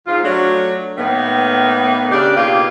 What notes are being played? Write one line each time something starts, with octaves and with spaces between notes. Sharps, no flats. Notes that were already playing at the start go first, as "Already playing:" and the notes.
G#2 F3 F4
F#3 A3 D4
A2 D#3 A#3 B3
C#3 D4 G4
B2 D#3 A#3 F4 G4 G#4